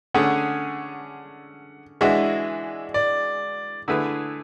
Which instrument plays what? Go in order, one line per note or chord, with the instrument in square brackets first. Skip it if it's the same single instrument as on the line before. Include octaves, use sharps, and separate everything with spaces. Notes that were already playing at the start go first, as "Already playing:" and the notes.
[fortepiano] D3 A3 C#4 G#4 [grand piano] F#5
[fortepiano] E3 G#3 D4 F#4 [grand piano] E5
[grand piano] D5
[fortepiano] D3 A3 E4 G#4 B4